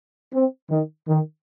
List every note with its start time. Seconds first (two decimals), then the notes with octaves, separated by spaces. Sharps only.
0.32 C4
0.69 D#3
1.07 D#3